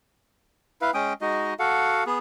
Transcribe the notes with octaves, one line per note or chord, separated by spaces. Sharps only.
E4 B4 F5
G#3 C#4 G5 D#6
G#3 D#4 F#4 D#5
F#4 A4 F5 F#5
B3 G#4